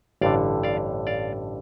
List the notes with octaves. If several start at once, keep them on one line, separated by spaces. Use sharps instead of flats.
A1 G2 D3 D5 F5
D5 F5
D5 F5